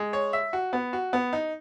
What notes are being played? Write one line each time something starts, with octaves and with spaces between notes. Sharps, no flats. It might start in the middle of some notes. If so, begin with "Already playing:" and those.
Already playing: G#3
C#5
E5
F#4
B3
F#4
B3
D#4